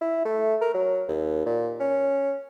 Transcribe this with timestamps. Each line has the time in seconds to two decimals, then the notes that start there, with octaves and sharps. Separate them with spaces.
0.01 E4
0.25 A3
0.62 A#4
0.75 F#3
1.08 D#2
1.46 A#2
1.80 C#4